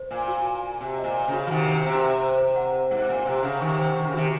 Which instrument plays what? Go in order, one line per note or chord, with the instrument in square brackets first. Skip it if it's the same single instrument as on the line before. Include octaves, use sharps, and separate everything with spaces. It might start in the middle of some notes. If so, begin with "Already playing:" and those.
Already playing: [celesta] C5
[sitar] A#2 [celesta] G#5
[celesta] F#4
G#5
G#5
[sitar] C3 [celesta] G#5
[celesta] D#5
[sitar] A#2
[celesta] G#5
[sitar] C#3
[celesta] F#4
[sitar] F3
[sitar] C3 D#3 [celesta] F#5
[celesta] C5
[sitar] C3 [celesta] A#5
[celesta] C5
A#5
C5
F#5
C5
[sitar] G#2 [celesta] F#5
[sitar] A#2 [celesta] F#5
[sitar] C3 [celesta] C5
[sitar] C#3 [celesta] F#5
[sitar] C3 D#3 [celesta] C#6
[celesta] C5
[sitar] D#3 [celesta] C#6
[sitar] C#3
[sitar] C3 D#3 [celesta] F#4